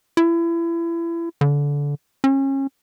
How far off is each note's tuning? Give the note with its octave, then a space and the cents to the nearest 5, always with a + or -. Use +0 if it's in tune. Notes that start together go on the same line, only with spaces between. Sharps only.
E4 +30
D3 -25
C#4 -30